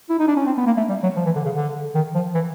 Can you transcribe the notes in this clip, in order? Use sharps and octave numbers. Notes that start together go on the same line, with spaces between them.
E4
D#4
D4
C#4
C4
B3
A#3
A3
G3
F#3
F3
E3
D3
C#3
D3
D#3
F3
E3